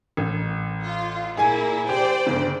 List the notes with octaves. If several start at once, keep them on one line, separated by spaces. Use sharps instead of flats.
A1
F4
A#2 A#3 E4 G#4 G#5
G4 C5 D5 G5
G1 C#3